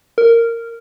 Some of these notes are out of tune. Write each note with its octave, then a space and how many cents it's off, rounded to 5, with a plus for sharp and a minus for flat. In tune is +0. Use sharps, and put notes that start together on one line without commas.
A#4 -15